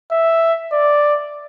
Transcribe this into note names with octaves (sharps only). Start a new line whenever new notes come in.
E5
D5